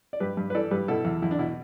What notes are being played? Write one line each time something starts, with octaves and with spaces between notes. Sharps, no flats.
D5
G2 G4 B4
G2
B4
E3 A4 D5
G2 G4 B4
B2 E4 A4
E2
E2 E4
D4
B2 E4